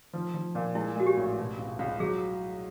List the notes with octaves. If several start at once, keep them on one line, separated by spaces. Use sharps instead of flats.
F3
F3
A#2
G#3 E4
G#3 F#4
G4
A1
B2
C#2
C#2
F#3 G#4